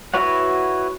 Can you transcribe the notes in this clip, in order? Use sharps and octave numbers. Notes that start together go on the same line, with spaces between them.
E4 F#4 B4 C#5 F#5